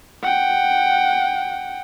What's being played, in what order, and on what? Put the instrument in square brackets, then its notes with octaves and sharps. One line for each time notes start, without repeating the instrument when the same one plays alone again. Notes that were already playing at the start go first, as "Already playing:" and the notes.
[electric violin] F#5 G5